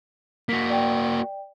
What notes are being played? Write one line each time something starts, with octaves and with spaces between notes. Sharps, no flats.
A#3 F#4 B6
D5 G5